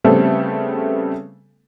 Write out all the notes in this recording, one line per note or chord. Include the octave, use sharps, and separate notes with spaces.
C#3 G3 A3 B3 C4 A4